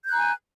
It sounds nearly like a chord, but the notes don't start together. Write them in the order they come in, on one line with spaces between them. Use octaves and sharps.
G6 F#6 A#5 G#5